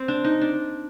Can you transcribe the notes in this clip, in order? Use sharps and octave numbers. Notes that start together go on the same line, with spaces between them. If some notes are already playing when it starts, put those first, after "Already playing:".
Already playing: C4
D4
D#4
D4